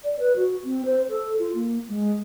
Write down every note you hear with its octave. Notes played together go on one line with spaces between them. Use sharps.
D5
B4
F#4
C4
C5
A4
F4
A#3
G#3